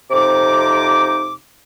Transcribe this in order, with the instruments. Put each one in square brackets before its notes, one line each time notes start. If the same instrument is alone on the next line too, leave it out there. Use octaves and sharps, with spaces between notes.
[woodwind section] F2 C3 D#4 D6